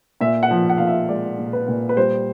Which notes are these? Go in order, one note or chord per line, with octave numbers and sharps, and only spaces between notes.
A#2 E5
F#5
F3
F#5
A#2 F5
E5
G#3 D5
A#2
B4
A#2
B4
G3 C5